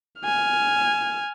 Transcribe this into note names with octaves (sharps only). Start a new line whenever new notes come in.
G#5 F6